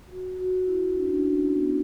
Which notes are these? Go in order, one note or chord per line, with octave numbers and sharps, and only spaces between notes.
F#4
F#4
E4
D4
C#4
D4
C#4
B3